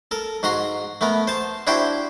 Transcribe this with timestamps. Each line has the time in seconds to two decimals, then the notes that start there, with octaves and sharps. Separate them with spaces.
0.11 A4 A#4
0.43 G#2 F#4 A#5 C6
1.01 A3 B3 A#4
1.27 C5 A5
1.67 D4 E4 F#4 G4 C5 G5